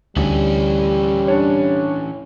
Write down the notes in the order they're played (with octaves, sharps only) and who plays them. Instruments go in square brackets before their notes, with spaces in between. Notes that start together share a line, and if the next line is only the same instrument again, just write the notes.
[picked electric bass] D2 [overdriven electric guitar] E3 C#4 [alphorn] G3
[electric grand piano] D4 C#5